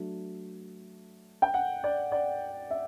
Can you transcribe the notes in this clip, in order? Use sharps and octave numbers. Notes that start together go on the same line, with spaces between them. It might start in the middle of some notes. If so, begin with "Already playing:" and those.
Already playing: F#3 A3 D4
G5
F#5
D5
D5
E5